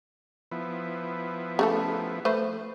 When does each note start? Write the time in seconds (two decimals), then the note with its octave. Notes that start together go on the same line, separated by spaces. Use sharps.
0.51 F3 B3 E4
1.59 C#3 A3 A4
2.25 A3 B4 C5